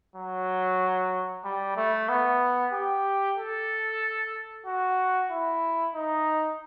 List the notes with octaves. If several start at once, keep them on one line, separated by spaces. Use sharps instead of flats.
F#3
G3
A3
B3
G4
A4
F#4
E4
D#4